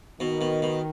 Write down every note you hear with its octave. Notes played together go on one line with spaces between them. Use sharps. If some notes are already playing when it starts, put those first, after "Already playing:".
B2 D#3
B2
B2